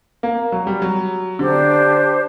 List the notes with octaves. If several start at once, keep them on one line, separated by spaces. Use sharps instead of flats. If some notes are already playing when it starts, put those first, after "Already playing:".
A#3
F#3
G3
F#3
D3 D4 G4 C5